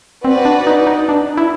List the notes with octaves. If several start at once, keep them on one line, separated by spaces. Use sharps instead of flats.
C4 F#4 B4 D5
D4
D#4
D#4
D4
E4